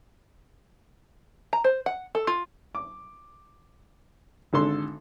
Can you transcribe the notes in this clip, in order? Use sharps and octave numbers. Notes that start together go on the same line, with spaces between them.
A#5
C5
F#5
A4
F4
D6
G#1 D3 A4 C6